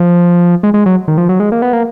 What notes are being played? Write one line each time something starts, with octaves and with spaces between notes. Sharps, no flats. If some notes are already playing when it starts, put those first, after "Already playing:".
Already playing: F3
G#3
G#3
F#3
D#3
F3
F#3
G#3
A#3
B3
A#3